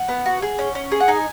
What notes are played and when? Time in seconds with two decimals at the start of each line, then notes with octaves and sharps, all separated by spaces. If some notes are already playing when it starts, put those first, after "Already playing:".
Already playing: F#5
0.08 B3
0.26 F#4
0.42 G#4
0.59 C#4
0.75 C#4
0.92 G#4
1.00 F#5
1.08 D#4 G#5